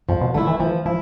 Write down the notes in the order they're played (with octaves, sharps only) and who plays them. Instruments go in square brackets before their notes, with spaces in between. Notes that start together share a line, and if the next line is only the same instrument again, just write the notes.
[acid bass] F2 [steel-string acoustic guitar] F3
[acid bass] B2
[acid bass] D3 [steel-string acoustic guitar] A3 E4
[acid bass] E3
[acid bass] E3 [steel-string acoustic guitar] F3
[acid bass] F3 [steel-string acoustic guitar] E4